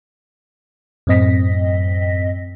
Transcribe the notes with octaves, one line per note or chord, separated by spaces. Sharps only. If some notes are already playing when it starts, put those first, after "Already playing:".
F#2 A2 C4 D#5 A#6 B6